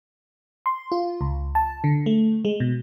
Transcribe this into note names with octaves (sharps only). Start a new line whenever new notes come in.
C6
F4
C#2
A5
D3
A3
G#3
B2